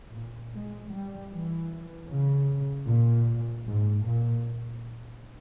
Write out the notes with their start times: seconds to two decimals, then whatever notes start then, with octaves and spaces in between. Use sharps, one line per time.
0.12 A#2
0.52 G#3
0.91 G3
1.31 E3
2.09 C#3
2.87 A#2
3.66 G#2
4.06 A#2